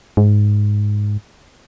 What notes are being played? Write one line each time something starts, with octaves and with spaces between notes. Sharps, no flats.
G#2